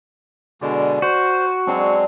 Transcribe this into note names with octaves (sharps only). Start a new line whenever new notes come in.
B2 D3 G#3 D5
F#4 C5
F#3 G#3 C4 D4